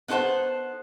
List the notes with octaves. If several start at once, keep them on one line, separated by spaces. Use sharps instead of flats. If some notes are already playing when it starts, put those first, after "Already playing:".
B3 D#4 A4 C5 F#5